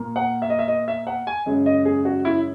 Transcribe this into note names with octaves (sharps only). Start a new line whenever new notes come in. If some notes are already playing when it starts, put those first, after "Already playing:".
Already playing: A#2 A#3
F#5
E5
D#5
E5
D#5
E5
F#5
G#5
F#2 C#3 G#3
D#5
G#4
F#4
E4